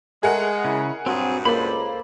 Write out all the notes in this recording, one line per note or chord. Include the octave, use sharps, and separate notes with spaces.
G#3 A3 G#4 A#4 F#5
C#3 E4
G2 A#2 F#3 C4 F#4 G#4
C#2 A#3 A4 C5 B5